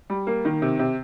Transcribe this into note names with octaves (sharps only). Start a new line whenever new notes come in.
G3
A#3
D#3
C3
C3